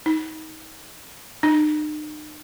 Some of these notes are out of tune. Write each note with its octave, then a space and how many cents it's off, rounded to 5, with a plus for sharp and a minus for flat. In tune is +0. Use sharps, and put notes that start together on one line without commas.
D#4 +25
D#4 -45